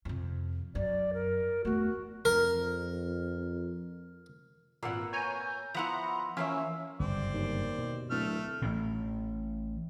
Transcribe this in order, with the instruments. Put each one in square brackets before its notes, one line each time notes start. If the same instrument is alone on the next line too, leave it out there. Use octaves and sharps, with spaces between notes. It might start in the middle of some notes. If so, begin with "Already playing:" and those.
[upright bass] F2 C3
[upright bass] F#2 [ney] D5
[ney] A#4
[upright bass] E2 A3 [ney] F#4
[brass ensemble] F2 [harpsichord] A#4
[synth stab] G#1 A#2 [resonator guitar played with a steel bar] A#3 B3 F#5 [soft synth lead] E6
[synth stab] C#5 G#5 A#5 [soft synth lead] G6
[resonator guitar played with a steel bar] F3 B3 E4 [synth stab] F#5 A#5 [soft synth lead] C6
[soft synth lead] E3 [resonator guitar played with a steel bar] F3 A#3 E5 [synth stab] C#4
[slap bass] G1 F#2 C#3 [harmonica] C4 D5
[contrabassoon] D#2
[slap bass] B2
[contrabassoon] D1 [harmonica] A3 F6
[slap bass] A1 A2